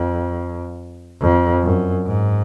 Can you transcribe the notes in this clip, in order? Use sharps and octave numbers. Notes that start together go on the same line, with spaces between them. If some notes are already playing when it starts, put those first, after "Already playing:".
Already playing: F2
F2
F#2
G#2